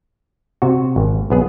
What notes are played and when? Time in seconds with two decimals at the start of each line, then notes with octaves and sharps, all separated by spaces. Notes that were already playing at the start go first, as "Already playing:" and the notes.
0.62 C3 F#4
0.96 G#1
1.30 B1 B3 G#4